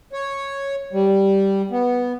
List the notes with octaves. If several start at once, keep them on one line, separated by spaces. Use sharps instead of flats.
C#5
G3
B3